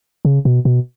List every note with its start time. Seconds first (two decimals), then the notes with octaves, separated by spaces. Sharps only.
0.25 C#3
0.45 B2
0.65 B2